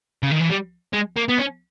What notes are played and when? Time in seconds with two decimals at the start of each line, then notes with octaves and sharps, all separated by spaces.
0.23 C#3
0.31 D#3
0.40 E3
0.50 G3
0.93 G#3
1.17 A#3
1.29 B3
1.39 C#4